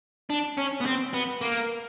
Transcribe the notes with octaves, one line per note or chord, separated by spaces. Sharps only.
D4
C#4
B3
C4
B3
A#3